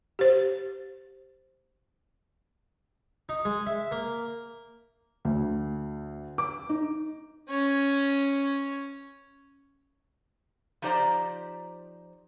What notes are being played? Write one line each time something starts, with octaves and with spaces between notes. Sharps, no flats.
G4 C5
D#4
G#3
E5
A#3
D2
D6
D#4
C#4 C#5
F3 D#4 G4 C5 D5 A#5